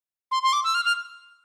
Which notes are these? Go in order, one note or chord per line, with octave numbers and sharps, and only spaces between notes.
C6
C6
D6
E6
F6
F6